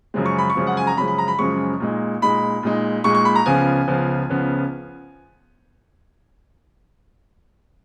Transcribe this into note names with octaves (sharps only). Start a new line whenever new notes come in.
F#2 C#3 F3 G#3
C#6
B5
C#6
F#2 C#3 F3 G#3
F#5
G#5
A#5
F#2 C#3 F3 G#3 B5
B5
A#5
B5
F#2 C#3 F3 G#3 C#6
A#2 G#3 D#4
A#2 G#3 D#4 B5
A#2 G#3 D#4
A#2 G#3 D#4 C#6
C#6
B5
A#5
C#2 C#3 F3 B3 G#5
C#2 C#3 F3 B3
C#2 C#3 F3 B3